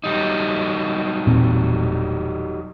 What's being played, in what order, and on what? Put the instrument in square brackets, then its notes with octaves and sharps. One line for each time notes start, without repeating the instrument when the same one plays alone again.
[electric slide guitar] F#3 G3 D#4
[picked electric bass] E1 A#2 C4